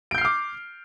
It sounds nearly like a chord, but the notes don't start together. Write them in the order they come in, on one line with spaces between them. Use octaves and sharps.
D7 G6 C7 F6 D6